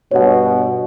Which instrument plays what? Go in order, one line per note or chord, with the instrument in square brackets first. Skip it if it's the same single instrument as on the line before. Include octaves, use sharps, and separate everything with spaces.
[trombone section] G2 B2 [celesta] C#5 F#5